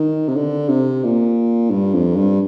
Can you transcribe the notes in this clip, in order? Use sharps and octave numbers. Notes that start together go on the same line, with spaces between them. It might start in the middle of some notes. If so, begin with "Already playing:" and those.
Already playing: D#3
C3
D3
C3
A#2
G2
F2
G2